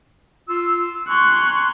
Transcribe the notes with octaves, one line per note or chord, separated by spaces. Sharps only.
F4 E6
G#5 A#5 C6 C#6 F#6